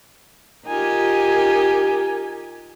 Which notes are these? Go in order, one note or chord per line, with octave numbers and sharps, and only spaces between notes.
D#4 F4 G4 A#4 G#5